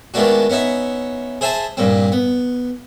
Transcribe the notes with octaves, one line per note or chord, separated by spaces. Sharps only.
D#3 G#3 A3 B3 D4 F#4
B3 C#4 D#4 E5
G#4 C5 E5 G#5 A5
G2 A#2 C4
B3